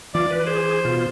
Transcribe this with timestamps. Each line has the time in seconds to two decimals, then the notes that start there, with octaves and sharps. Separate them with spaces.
0.15 E3 F4 D5
0.31 B4
0.47 G#4 C5
0.85 B2 F4